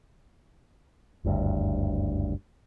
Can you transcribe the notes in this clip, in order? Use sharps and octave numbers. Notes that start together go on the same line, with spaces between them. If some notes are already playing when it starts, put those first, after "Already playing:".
F#1 D2 G2